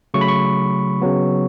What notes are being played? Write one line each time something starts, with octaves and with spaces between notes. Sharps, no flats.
C#3 F#3 A3 C#6
B5
C#6
C#3 F#3 B3